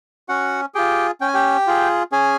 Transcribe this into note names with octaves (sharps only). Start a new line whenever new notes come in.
C#4 F#4 F#5
F4 G4 G#4 G5
C#4 G5
G#5
G4 G5
F4 G#4
C#4 G#4 G#5